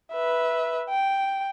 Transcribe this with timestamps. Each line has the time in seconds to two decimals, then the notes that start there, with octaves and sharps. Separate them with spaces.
0.12 B4 E5
0.89 G5